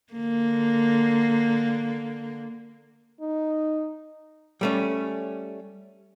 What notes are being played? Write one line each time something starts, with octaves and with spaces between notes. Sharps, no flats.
D3 A#3
D#4
G3 A3 C#4